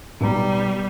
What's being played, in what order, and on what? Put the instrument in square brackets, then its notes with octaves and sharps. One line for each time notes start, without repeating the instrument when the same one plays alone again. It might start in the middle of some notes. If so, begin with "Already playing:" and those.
[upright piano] B1 B3 A#5 [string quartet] G3